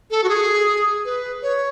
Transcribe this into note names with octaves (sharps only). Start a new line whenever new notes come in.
A4
F#4
G#4
B4
C#5